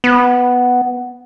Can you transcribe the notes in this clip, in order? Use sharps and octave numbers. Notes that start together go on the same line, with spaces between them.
B3